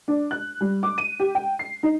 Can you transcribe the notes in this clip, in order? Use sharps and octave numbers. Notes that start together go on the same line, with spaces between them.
D4
F#6
G3
D6
D#7
G4
G5
C7
D#4